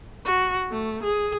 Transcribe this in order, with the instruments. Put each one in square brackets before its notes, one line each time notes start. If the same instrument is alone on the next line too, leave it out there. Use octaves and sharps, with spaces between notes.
[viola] F#4
A3
G#4